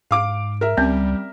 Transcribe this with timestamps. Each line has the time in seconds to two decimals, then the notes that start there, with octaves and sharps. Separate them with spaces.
0.11 G#2 F5 D6 D7
0.61 A#4 E5
0.77 C#2 G3 C4 C#4